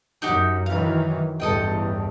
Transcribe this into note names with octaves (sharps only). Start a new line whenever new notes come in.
F#2 D#4 F#4 G4
D#3 E3 F#3 F5
A1 E2 G2 A4 D#5 G5